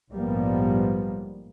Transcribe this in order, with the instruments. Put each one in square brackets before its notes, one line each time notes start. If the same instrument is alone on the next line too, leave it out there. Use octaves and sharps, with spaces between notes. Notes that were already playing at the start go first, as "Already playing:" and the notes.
[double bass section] A#1 G#2 F3 G3 A#3 B3